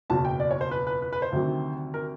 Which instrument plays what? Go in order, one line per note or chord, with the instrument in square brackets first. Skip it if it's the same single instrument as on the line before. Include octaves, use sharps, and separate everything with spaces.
[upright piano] F#1 E2 B2 F#3 A5
G5
D5
C#5
C5
B4
B4
B4
B4
C5
D2 C3 D#3 F#3
A#4